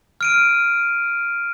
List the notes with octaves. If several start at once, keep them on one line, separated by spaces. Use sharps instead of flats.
F6 D7 D#7